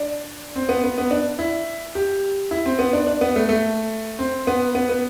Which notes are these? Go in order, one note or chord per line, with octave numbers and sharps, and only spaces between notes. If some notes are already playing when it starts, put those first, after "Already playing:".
Already playing: D4
C4
B3
B3
B3
D4
E4
G4
E4
C4
B3
D4
D4
B3
A3
A3
C4
B3
B3
B3